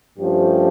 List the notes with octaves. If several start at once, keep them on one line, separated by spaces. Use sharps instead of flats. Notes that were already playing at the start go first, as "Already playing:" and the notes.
G2 F3 A3 C#4 G4